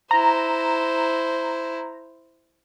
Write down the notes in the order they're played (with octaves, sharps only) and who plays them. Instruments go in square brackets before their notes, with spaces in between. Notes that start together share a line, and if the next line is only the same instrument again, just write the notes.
[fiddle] E4 C5 [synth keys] A#5